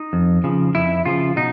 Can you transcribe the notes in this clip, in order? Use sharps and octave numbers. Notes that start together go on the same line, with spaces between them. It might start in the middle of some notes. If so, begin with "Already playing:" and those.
Already playing: D#4
F2
C#3 F3
F2 E4
C#3 F3 F4
B2 D#4